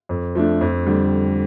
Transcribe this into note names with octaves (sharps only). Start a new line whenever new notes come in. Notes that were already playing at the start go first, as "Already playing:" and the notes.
F2
F3 A3 D4
F2
D3 G3